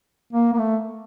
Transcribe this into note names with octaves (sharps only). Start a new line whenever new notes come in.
A#3
A#3
A3